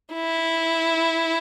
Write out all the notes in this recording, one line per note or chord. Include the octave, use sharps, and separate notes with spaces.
E4